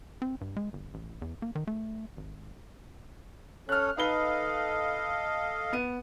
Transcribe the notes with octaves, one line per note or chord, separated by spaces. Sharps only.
C4
G2
G#3
G1
A1
E2
A#3
D#3
A3
G#1
C#4 A4 C#5 F6 F#6
D#4 A4 B4 D#5 F5 G7
B3 D#7